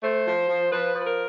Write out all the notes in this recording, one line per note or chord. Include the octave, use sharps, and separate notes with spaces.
A3 C5
F3
F3
F3 B4
F3
B4
A#4